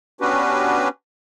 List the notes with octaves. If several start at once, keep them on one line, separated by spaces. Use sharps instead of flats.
B3 C#4 D4 F#4 G4 B4